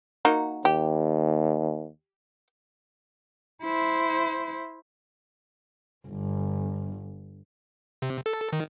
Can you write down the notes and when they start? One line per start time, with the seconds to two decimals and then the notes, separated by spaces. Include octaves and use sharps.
0.25 A#3 D#4 F#4
0.65 D#2 G4
3.64 E4 C5
6.08 G1
8.02 C3
8.26 A4
8.53 D#3